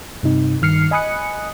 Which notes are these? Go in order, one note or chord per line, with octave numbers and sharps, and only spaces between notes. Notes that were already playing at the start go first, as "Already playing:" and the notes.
G2 C3 D#4
G2 D#3 F6 C7 C#7
D#5 G#5 B5 D#6 F#6 C#7